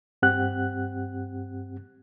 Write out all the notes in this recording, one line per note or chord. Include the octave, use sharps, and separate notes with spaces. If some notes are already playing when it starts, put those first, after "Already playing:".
G2 C4 G4 F#5 F#6